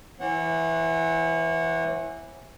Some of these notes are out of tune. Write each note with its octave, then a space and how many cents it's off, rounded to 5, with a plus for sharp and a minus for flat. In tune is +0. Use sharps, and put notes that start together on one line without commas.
E3 +0 C#5 -45 F#5 +0